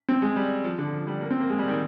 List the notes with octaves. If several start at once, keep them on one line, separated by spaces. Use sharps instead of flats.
C4
G#3
G3
F3
D3
F3
G3
A#3
C4
A#3
G#3
G3
D#3